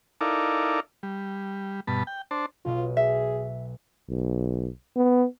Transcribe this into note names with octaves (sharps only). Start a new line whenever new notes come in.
D#4 E4 A4 A#4 D5 F5
G3
G2 B2 A5 B5
G5
D4 C5 A5
B1 B2 F4 D#5
G#4 E5 E7
B1
B3